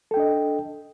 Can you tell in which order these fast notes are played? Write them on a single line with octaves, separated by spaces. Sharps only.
A4 G5 D4 D#5